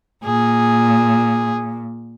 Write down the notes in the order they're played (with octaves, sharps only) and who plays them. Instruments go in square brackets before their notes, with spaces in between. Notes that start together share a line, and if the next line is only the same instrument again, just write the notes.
[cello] A#2 [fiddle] G#4